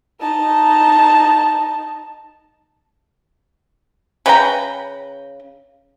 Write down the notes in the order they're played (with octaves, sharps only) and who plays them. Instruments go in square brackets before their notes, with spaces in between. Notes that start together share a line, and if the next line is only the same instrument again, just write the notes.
[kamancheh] D#4 A5
[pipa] C#3 B4 G5 A#5